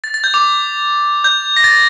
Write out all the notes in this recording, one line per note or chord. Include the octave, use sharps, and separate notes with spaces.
A6
A6
G6
D6
G6
A#6
A6